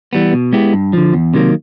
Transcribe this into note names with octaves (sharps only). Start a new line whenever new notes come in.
E3 G3 B3
B2
G#3 B3 E4 G4
G2
D3 F3
E2
C3 D#3 F#3 A#3